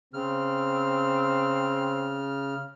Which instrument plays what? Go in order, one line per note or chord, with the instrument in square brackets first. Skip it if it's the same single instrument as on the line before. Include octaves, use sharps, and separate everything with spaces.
[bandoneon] C#3 F6 [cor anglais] C4